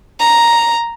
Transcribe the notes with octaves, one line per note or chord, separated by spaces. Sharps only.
A#5